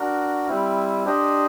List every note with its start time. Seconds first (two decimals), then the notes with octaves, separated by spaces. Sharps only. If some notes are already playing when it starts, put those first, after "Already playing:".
Already playing: D4 F#4 A#4
0.48 G3 C4 E4
1.05 D4 G4 C5 D#5